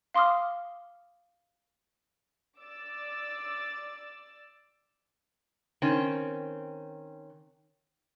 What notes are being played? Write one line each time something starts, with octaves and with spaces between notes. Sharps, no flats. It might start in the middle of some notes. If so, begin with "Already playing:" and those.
F5 C6 D6 D#6 F6
D5 D6 E6 A6
D#3 C4 C#4